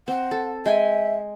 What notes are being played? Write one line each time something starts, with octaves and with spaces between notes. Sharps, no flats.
C4 F#5
A4
G#3 E5 G5 G#5